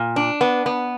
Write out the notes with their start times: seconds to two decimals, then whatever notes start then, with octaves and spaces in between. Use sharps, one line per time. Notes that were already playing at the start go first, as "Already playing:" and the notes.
Already playing: A#2
0.16 D4
0.41 B3
0.66 B3